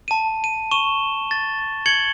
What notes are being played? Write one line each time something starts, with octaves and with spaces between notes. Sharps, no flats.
A5 D#7
D#7
C#6 D#7 E7 G7
A6
G#6 C#7 F#7 G7